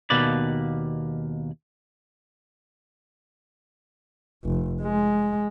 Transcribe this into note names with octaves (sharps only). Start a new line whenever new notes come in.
D#2 B2 A#3 B4 D5
F1
G#3